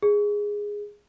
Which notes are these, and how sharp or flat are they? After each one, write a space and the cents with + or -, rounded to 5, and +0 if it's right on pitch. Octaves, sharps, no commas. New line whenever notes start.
G#4 -10